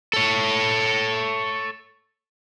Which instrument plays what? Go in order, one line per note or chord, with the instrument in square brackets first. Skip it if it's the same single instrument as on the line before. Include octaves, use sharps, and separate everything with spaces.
[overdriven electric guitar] A4 C#5